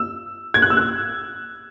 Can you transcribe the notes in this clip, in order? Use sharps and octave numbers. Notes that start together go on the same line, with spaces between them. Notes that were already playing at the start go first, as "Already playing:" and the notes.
Already playing: E6
G#6
F#6
E6
F#6